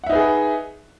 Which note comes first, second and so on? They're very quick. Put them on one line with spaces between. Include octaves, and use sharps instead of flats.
F#5 E5 D#4 B4 G#4